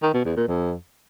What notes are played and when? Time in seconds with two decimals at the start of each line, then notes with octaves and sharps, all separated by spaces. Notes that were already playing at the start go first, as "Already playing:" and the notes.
0.02 D#3
0.14 B2
0.25 E2
0.36 A#2
0.48 F2